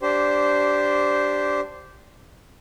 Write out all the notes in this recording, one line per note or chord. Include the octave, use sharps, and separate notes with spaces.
D4 G4 C5